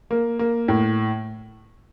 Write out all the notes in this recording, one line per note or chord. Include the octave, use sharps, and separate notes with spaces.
A#3
A#3
A2